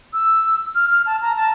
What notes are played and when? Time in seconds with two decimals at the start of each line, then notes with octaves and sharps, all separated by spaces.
0.13 E6
0.75 F6
0.91 F6
1.06 A5
1.22 A#5
1.37 A5